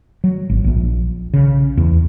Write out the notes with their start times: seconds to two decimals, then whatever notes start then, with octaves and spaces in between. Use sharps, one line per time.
0.24 F#3
0.50 G#1
0.64 A#1
1.34 C#3
1.77 E2